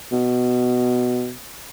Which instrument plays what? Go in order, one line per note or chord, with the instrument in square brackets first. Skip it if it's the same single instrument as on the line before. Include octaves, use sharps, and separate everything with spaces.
[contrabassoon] B2